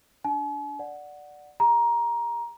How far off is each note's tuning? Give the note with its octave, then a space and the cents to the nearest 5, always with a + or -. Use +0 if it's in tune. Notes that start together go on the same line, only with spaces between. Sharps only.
D4 -15 G#5 +45
D5 +0 F#5 +0
G#4 -35 A#5 +15